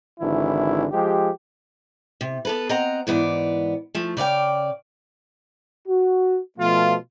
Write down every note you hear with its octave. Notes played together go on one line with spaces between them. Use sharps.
G#1 D3 E3 E4
F3 G#3 G4
C3
B3 A4 B4
C4 D#5 F5 F#5 A#5
G#2 E3 B3 D5
F3 A3
C#3 D5 F5 G5
F#4
B2 F3 A3 F4